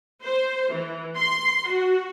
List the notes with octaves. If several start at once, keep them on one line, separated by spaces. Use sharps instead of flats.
C5
E3
C6
F#4